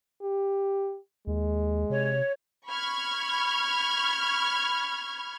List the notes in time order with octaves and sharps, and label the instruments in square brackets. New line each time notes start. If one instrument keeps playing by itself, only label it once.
[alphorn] G4
[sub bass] D#2 [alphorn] G#3
[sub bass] C3 [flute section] C#5
[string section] B5 C#6 F6 G#6